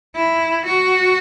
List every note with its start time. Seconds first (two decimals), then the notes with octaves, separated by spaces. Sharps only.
0.15 E4
0.66 F#4